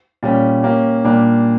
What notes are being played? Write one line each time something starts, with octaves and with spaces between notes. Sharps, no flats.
A#2 G3 C#4
A#3 C#4 G4
A#2 G3 A#3 D4 G4